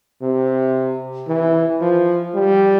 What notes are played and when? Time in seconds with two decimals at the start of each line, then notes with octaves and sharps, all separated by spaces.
0.22 C3
1.28 E3
1.81 F3
2.35 G3